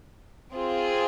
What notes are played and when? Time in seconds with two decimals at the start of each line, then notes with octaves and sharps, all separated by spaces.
0.53 C4 F4 G#4